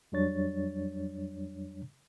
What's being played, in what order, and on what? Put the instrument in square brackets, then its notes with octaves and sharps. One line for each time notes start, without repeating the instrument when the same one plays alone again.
[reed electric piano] F2 F#3 G3 D4 C#5 A6